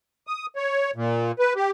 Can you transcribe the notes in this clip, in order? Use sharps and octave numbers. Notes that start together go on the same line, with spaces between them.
D#6
C#5
A#2
B4
G4